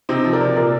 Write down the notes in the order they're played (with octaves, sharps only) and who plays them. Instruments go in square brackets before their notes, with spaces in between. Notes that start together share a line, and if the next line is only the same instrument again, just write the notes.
[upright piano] C3 C4 D#4
F3
A#4 D5
C3
A#2 A#4 D5